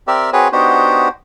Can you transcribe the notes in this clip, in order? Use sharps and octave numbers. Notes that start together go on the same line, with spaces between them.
C4 G4 A#4 D5 E5
C4 F#4 G#4 B4 C#5
B3 D4 D#4 F#4 G4 C5